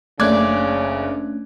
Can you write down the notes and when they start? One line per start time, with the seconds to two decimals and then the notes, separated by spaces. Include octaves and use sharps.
0.20 F#1 C#3 A3 C#4 D4 D5 F#6 G#6